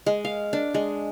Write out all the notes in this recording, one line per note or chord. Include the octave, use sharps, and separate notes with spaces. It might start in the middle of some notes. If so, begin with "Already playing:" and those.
G#3
F5
D4
G#3